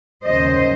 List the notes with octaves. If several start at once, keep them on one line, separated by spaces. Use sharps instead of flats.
D#2 C#3 F#3 C5 D#5